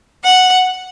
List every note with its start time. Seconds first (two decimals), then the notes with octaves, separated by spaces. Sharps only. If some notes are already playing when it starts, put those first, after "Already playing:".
0.24 F#5